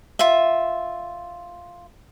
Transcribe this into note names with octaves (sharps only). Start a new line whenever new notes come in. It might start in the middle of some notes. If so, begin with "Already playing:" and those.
F4 E5